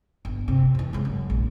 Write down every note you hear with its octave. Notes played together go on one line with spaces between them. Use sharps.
G1
C3
F2 E3
C#3 G#3
F#2
A#1